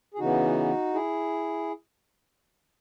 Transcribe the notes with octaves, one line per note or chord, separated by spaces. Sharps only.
G#4
C#3 E3 B3 D#4 F#4
E4 G#4